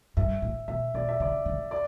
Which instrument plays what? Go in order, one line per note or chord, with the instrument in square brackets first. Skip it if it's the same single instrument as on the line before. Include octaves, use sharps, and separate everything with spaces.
[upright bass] G2 [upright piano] E5
[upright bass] A2
[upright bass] B2 [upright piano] E5
[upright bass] B2 [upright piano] D5
[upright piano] E5
[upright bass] C#3 [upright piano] D5
[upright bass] D3
[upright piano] D5